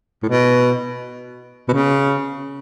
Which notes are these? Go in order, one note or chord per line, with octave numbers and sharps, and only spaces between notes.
A2
B2
B2
C#3